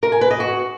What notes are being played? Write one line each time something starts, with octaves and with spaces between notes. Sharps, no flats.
A#4
G#5
B4
D#5
F#4